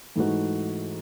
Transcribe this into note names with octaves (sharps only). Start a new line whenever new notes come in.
G#2 E3 A3 D#4 F#4